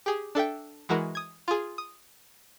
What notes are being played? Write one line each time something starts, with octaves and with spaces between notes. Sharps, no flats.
G4 G#4
D4 A4 E5 G5
E3 G#3 E4 F#4 A#4
D#6 G#6
F4 G#4
D#6